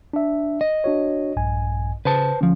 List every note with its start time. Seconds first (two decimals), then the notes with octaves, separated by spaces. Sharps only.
0.13 D4 E5
0.61 D#5
0.84 D4 F#4 C#5
1.37 A#1 G2 G#5
2.05 C#3 B4 C5 A5
2.41 D2 F3 C#4